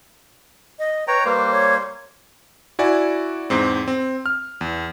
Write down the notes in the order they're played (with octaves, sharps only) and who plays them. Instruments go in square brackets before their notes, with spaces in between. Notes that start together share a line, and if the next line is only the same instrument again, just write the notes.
[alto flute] D#5
[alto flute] B4 [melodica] C#5 G5 A#5
[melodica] G3 A#3 C5 [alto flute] B4
[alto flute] C#5
[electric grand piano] E4 F#4 D5 G#5
E2 G#2 C4
C4
F6
E2